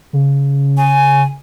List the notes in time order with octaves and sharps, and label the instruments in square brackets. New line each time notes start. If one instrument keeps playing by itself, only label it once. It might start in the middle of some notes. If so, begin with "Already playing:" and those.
[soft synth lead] C#3
[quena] G#5